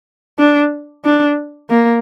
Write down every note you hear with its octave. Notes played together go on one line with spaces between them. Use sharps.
D4
D4
A#3